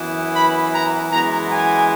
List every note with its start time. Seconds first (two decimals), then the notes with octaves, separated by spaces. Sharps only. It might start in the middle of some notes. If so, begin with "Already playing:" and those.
Already playing: F#2 E3 B3
0.33 B5
0.72 A#5
1.10 F#2 E3 G#3 B3 A#5
1.50 G#5